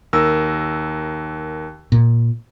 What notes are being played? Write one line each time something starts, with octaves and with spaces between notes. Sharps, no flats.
D#2 A#4 E6
A#2